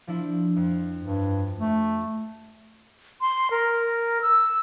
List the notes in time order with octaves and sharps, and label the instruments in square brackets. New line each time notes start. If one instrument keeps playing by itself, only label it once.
[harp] F3 D4 E4
F2
[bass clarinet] G2
A3
[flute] C6
A#4
E6